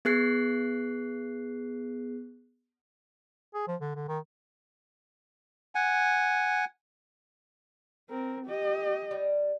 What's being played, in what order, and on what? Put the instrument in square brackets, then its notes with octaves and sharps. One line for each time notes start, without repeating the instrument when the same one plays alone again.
[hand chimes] B3 G#4 F#6 C7
[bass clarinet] G#4
F3
D3
D3
D#3
[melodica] F#5 G#5
[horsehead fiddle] C4 A#4
G4 D#5
[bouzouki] G3